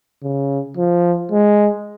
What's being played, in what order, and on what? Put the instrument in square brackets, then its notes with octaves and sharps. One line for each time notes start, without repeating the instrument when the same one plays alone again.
[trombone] C#3
F3
G#3